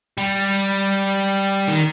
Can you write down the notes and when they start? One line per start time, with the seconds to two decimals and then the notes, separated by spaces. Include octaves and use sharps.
0.18 G3
1.68 D#3